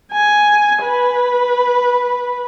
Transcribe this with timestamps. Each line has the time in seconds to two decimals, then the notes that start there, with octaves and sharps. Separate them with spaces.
0.12 G#5
0.83 B4